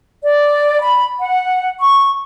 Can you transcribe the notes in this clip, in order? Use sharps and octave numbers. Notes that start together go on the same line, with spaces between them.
D5
B5
F#5
C#6